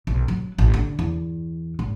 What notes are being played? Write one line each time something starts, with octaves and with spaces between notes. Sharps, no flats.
B1
F#3
A1
D3
E2
G#1